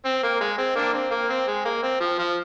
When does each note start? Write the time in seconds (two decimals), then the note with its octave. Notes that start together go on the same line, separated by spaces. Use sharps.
0.05 C4
0.23 A#3
0.41 G#3
0.58 C4
0.75 A#3 D4
0.93 C4
1.11 A#3
1.29 C4
1.47 G#3
1.65 A#3
1.83 C4
2.00 F3
2.19 F3